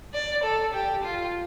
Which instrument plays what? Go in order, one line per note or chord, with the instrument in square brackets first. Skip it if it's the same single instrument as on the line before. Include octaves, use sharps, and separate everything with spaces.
[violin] D5
A4
G4
F4